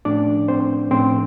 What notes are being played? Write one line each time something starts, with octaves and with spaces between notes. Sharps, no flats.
A2 F3 A3 C#4 D4 D5
C4 C5
A2 F3 A3 C4 C#4 C5